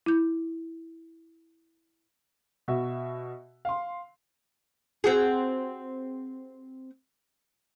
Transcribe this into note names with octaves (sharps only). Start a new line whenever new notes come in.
E4 G6
B2 F#4 E5
F5 C6
C4 F#4 G#4